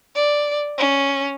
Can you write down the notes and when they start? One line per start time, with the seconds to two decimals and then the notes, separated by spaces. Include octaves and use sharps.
0.15 D5
0.78 C#4